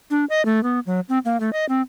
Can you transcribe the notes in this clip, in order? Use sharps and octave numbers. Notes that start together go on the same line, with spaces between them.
D4
D#5
A3
B3
F#3
C4
A#3
A3
D#5
C4